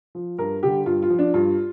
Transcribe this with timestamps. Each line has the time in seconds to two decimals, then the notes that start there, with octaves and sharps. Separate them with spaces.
0.15 F3
0.38 G2 A#4
0.62 D3 G3 G4
0.86 G2 F4
1.02 F4
1.09 F3
1.19 D4
1.34 G2 F4